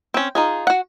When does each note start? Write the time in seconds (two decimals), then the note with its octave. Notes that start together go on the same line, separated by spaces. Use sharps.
0.14 C4 C#4
0.35 D#4 F4 G#4
0.67 F#4 F#5